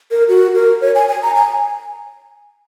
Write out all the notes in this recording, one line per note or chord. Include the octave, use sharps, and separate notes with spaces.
A#4
F#4
A#4
C#5
G#5
G#5
A#5
G#5